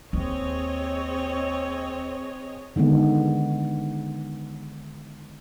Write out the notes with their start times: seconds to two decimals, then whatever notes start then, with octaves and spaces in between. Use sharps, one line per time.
0.13 D#2 C4 G#4 C#5 D#5
2.76 D3 D#3 G#3 B3